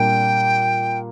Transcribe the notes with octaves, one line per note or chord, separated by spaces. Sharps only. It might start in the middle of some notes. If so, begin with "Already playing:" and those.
Already playing: A#2 G3 A#3 D4 G5